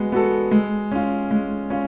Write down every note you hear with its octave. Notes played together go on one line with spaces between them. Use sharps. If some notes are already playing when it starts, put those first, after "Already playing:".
Already playing: G#3 B3 F#4
B3 F#4 A4
G#3
C#4 F4
G#3
C#4 F4